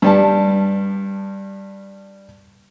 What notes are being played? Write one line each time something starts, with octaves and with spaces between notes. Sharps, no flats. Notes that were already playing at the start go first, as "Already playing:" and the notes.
G2 G3 A5